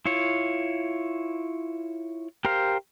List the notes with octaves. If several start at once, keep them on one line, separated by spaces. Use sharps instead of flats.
E4 F4 C#5
G4 A#4 C5 F5